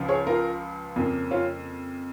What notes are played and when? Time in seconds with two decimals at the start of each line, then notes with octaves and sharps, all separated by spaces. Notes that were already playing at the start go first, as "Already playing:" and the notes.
Already playing: C#2 C#3 F3
0.08 G#4 C#5
0.27 F4 A#4
0.96 F2 C#3 A#3
1.31 C#4 F4